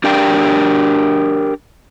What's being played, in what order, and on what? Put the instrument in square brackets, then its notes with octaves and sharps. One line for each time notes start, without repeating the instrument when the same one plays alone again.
[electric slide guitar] D4 G4 A#4 D5 G5